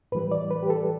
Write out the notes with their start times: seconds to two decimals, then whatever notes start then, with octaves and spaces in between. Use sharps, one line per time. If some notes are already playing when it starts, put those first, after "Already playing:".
0.12 A2 B4
0.15 E3 G3
0.32 D5
0.51 B4
0.63 G4
0.70 A4